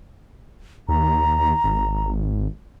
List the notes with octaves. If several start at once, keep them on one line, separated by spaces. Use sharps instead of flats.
D#2 A#5
G#1